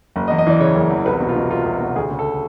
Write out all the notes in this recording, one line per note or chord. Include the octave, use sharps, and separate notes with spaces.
F#1
D#5
E2
D#5
E3 D5
C#3 C#5
F#1
E2
C2 B4
B2
F4
B2
C2 F4
C2
F#4
B2
D2 G#4
C#3
A4